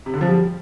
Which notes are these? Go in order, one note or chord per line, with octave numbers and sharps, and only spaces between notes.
C3
D3
F3
G3